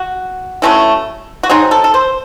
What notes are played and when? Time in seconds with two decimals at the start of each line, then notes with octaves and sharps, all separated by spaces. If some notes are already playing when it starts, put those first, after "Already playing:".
Already playing: F#4
0.62 F#3 A3 C#4 E4
1.43 F#4
1.49 F#3 C4 D#4 G#4
1.71 A4
1.84 A4
1.94 C5